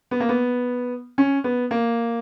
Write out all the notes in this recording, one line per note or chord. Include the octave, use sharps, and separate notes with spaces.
B3
A#3
B3
C#4
B3
A#3